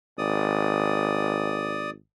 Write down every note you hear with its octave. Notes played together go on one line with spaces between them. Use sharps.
G#1 D5 D#6